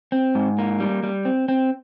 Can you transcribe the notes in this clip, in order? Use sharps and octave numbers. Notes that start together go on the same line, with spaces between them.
C4
G#2
A#3
G3
G3
C4
C4